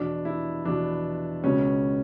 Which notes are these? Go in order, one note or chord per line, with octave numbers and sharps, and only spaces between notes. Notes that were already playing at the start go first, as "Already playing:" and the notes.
Already playing: E2 B2 D4
E4
E2 B2 D4
C#2 B2 C#4